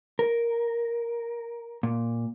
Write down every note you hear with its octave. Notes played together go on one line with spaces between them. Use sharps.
A#4
A#2